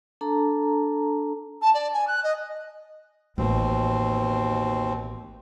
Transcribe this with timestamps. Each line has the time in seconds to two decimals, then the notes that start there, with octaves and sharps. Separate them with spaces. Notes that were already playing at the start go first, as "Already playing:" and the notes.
0.21 D4 A4 A5 A#5
1.62 A5
1.74 D5
1.93 G#5
2.07 F#6
2.23 D#5
3.38 A1 D#2 B2 C4